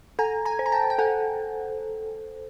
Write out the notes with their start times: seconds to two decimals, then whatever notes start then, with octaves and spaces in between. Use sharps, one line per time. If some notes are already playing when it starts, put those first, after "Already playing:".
0.19 A4 G#5 A#5
0.45 G#5 A#5
0.59 C5
0.66 A#5
0.72 G5 A5
0.90 G5
0.98 A4 F#5 G#5